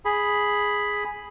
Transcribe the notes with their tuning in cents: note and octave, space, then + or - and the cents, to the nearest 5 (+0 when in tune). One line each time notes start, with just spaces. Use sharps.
G#4 +0 B5 +0